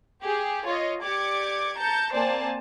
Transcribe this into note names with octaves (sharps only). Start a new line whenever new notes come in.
G4 G#4
F4 C#5 D#5
G4 D5 D6 G#6 C#7
A5 A#5 G6 C#7
A#3 C4 C5 D5 G#5 A5